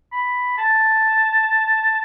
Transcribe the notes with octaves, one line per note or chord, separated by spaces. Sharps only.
B5
A5